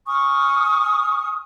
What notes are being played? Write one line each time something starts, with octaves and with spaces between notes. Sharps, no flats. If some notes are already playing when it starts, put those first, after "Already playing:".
G#5 C#6 D#6 F6